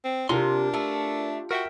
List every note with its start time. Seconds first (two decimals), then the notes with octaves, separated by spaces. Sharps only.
0.04 C4
0.29 C3 D4 F4 G4 A#4 C6
0.74 A3
1.51 F#4 A#4 E5 G5